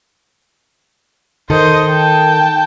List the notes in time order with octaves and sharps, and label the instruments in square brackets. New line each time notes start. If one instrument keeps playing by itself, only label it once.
[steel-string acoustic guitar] D#3 A4 [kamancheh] C5 D#5
[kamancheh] G5 A5